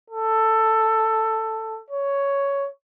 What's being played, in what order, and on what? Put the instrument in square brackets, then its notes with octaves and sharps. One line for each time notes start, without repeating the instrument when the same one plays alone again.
[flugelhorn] A4
C#5